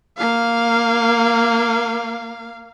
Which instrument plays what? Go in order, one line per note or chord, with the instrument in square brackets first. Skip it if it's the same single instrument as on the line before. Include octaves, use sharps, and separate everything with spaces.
[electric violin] A#3 F5